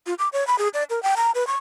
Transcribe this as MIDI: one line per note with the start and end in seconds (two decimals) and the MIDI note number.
0.06 0.14 65
0.19 0.29 86
0.33 0.46 73
0.47 0.58 83
0.59 0.68 68
0.74 0.84 74
0.90 1.02 70
1.03 1.15 79
1.17 1.31 82
1.35 1.47 71
1.47 1.58 85